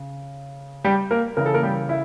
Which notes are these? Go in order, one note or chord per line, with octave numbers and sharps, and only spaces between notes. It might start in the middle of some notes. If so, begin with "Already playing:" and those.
Already playing: C#3
G3 G4
A#3 A#4
C#3 E3 A#4
A4
A#3 A#4
G3 G4
E4